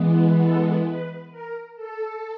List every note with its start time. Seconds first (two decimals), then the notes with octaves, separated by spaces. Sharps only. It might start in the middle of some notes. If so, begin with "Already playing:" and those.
Already playing: E3 G#3 B3
0.42 A4
0.86 B4
1.31 A#4
1.76 A4